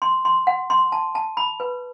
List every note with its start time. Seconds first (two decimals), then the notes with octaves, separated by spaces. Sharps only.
0.02 C6
0.25 C6
0.47 F#5
0.70 C6
0.92 A5
1.15 A5
1.37 B5
1.60 B4